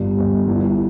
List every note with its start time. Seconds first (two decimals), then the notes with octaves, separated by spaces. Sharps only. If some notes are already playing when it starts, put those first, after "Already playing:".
Already playing: G1 G2 G3
0.17 G1 G2 G3
0.48 G1 G2 E3